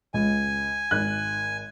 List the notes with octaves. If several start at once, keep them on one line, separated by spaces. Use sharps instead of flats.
C#2 G#5
G#1 F#6